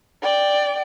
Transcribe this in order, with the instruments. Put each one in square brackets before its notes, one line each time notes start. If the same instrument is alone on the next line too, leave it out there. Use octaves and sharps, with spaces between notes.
[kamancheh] D5 G5